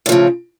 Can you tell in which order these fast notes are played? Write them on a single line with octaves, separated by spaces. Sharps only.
A2 F3 C#3